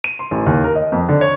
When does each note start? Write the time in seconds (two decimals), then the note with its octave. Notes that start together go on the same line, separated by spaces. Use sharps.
0.04 D#7
0.19 C6
0.31 A1
0.46 D#2
0.64 A#4
0.76 D#5
0.92 F2
1.09 D3
1.21 C#5